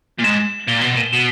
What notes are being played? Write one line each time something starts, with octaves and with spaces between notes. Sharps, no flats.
A#2
G#2 E7
A#2 G7
B2
A#2
B2 E7